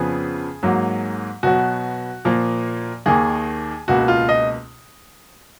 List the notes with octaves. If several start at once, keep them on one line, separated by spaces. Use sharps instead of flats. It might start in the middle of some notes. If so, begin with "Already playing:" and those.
Already playing: F2 C#3 F3 B3 G#4
G#2 F#3 A#3
B2 F#3 B3 F#4
A#2 F3 A#3
D#2 D#3 A#3 G#4
C#2 B2 A#3 F#4
F4
D#5